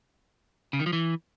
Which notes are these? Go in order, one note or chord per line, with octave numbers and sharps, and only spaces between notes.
C#3
D#3
F3
E3